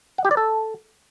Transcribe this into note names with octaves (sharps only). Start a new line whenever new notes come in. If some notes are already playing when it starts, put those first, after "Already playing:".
F#5
G4
D5
A4